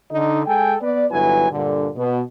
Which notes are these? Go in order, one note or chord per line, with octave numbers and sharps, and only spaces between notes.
D3 D#4
G#3 A4 G5 G#5
B3 B4 D5
G1 F#3 E4 B4 G#5
G2 A#2 D3
B2